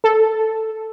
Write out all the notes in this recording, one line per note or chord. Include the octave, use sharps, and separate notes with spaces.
A4